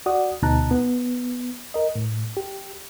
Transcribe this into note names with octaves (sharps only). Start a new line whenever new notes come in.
F#4 D5 F#5 D#6
D2 B2 D#4 A5 A#5 F#6
B3
A#4 D#5
A2
G4